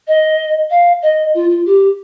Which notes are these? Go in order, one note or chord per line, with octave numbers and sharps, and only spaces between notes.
D#5
F5
D#5
F4
F4
G4